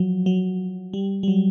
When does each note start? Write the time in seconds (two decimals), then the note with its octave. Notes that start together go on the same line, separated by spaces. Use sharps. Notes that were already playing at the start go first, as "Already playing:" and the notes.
Already playing: F3 F#3
0.26 F#3
0.93 G3
1.23 G3
1.28 F#3